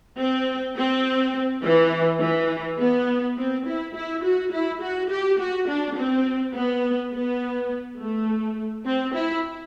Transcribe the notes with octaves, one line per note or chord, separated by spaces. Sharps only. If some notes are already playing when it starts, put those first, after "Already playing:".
C4
C4
E3
E3
B3
C4
E4
E4
F#4
E4
F#4
G4
F#4
D4
C4
B3
B3
A3
C4
E4